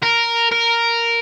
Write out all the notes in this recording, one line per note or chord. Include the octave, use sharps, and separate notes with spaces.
A#4
A#4